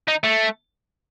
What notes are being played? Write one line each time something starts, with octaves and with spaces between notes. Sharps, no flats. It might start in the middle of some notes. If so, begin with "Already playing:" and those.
D#4
A3